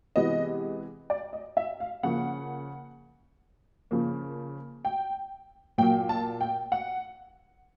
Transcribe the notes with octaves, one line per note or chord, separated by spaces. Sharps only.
C3 E3 G#3 B3 D#5
D5
D#5
E5
F5
C#3 F3 A#3 F#5
C#3 F3 A#3
G5
A#2 F#3 A#3 G5
A5
G5
F#5